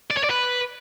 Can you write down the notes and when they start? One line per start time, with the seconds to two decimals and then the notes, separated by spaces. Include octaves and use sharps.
0.10 D5
0.17 C#5
0.24 D5
0.30 B4